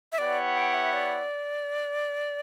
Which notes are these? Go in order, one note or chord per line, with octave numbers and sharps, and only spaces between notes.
E5
B3 E4 G4 C#5 D5 F#5
G5
E5
D5